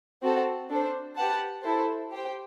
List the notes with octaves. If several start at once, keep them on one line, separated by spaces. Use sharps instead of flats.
C4 F#4 A4 C5
D4 A4 C5
G4 B4 F#5 A5
E4 A4 C5
G4 C5 G5